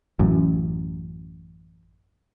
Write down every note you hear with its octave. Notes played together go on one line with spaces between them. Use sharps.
A1 F#2